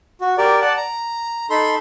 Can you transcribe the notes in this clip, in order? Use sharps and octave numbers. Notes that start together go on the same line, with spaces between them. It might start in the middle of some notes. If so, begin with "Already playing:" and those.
F#4
G4 A#4 D5
D5 F#5 A5
A#5
D#4 A4 B5 C6